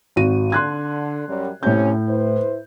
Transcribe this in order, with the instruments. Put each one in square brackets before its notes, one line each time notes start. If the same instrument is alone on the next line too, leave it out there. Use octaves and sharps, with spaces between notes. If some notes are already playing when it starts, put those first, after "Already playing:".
[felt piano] G#1 F#4 D#7
[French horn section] D3 [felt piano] C6 F#6 G#6
[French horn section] F#2 G3
[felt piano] A2 G6 [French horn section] C3 C#4
[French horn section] E4 B4 C5